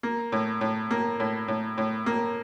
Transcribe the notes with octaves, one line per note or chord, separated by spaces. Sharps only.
A#3
A2
A2
A#3
A2
A2
A2
A#3